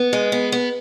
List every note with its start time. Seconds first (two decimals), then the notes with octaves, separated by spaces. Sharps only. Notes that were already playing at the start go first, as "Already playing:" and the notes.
Already playing: B3
0.13 G#3
0.32 B3
0.52 B3